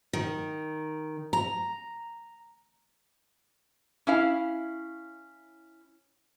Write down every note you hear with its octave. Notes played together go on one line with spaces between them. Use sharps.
D#3
A#5
C#4 E4 F5